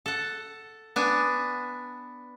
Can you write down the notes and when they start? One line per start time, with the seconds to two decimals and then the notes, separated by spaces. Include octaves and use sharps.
0.06 A4 F#5
0.96 B3 D4 G#5